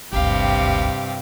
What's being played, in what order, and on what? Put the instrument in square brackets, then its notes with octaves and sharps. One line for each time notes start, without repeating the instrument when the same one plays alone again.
[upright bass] G#1 D2 [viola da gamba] G2 C3 [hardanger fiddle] G4 F5